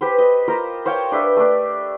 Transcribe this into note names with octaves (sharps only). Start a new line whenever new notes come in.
G4 B4 C5
D#5
F4 A#4 C5 A#5
C5 C#5 F5 G5
D4 B4 E5
A3 D4